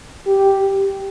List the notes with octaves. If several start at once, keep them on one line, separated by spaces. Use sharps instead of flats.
G4